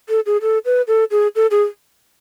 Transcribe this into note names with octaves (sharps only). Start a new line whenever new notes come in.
A4
G#4
A4
B4
A4
G#4
A4
G#4